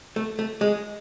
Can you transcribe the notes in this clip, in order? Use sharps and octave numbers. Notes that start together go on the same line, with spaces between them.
A3
A3
G#3